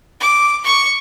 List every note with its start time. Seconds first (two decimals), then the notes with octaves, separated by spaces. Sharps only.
0.20 D6
0.64 C#6